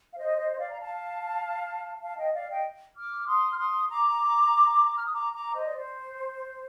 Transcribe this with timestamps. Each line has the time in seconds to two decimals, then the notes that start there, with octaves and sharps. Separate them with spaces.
0.11 F5
0.17 C5 D#5
0.37 C5 D#5
0.52 D#5
0.58 D5 F5
0.71 A#5
0.79 F5 A5
2.03 F5 A5
2.18 D#5 G5
2.29 G5
2.33 D5 F5
2.49 D#5 G5
2.96 D6 F6
3.26 C6 D#6
3.52 F6
3.58 C6 D#6
3.88 A#5 D6
4.97 F6
5.05 D#6
5.12 A#5 D6
5.33 A#5 D6
5.54 C5 D#5
5.65 D5
5.75 C5